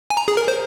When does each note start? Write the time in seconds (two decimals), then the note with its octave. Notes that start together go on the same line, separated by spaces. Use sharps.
0.10 G#5
0.17 A#5
0.28 G#4
0.37 A#4
0.48 C5